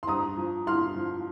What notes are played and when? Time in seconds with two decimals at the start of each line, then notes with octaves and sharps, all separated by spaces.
0.03 C6
0.07 G2 A#5 D#6
0.37 F3
0.67 G2 C6 F6
0.96 F3